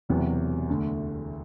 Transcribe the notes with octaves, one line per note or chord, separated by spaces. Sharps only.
E1 E2 C3 F#3 B3
D2 D3 A3